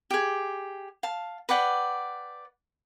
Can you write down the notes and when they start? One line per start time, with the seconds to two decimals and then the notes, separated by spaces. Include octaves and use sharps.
0.11 G4 G#4
1.03 F5 A5
1.49 B4 D5 F#5 G5